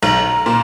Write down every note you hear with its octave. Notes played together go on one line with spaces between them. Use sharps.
B1 A#5
A#2